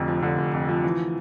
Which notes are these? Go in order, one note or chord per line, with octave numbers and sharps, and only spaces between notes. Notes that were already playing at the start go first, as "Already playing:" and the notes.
Already playing: F1 F2 D3
F3
D3
F1
F2
F3
E3